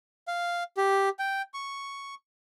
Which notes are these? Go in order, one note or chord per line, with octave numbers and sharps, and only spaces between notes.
F5
G4
G5
C#6